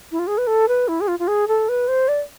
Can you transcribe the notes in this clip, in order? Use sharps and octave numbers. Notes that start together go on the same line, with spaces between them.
E4
F4
G#4
B4
A4
B4
E4
G#4
F4
F4
G#4
A4
B4
C5
D5